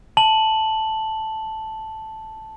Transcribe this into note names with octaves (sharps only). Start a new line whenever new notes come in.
A5 F#7